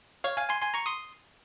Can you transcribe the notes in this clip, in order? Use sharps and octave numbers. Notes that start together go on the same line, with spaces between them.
C#5 F5
F5 G#5
G#5 C6
G#5 C6
A#5 C#6
C6 D#6